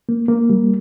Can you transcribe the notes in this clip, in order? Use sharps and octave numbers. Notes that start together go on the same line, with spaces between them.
A#3
A#3
G3